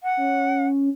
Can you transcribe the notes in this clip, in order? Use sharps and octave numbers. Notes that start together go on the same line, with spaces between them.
F#5
C#4